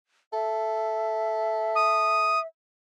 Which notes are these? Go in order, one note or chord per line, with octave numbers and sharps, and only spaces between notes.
A4 E5
D#6